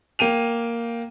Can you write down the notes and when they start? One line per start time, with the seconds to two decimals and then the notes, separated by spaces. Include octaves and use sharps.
0.19 A#3 G5 D#7 F7